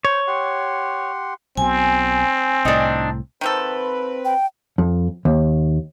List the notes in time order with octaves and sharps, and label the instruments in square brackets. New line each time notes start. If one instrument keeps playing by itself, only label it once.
[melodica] C5 [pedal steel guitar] C#5
[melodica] G4 F#5 C6
[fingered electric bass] B1 B2 [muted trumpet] C4 [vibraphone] G#5
[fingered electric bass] C2 A2 [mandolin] D4 D#4
[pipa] D#3 F3 A4 [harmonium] C4 B4
[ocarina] G5
[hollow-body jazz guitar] F2
D#2